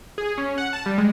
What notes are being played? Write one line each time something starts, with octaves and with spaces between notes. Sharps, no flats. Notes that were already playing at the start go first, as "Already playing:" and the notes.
G#4
C#4
F#5
A5
G3
G#3